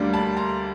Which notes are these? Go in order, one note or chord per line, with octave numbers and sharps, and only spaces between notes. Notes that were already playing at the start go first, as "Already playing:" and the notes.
Already playing: D2 D3 G3 A#3 D4
A5 B5
A#5 C6